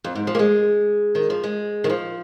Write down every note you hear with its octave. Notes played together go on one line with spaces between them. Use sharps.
F2
G#2
F3
A#3
G#3
D#3
F3
G#3
D#3
F3